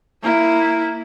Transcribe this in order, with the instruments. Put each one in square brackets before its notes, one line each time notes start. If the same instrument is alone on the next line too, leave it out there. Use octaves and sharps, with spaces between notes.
[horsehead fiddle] A#3 E4